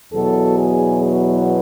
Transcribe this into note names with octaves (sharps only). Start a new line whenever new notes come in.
E2 B2 F#3 A4
G#4
F#4